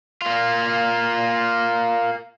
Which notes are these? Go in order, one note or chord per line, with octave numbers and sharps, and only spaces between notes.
A#3 F4